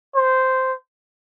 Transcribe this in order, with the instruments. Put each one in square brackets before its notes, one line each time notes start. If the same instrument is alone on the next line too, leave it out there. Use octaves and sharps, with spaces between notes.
[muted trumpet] C5